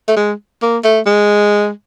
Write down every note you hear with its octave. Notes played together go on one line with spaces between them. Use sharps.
A3
G#3
A#3
A3
G#3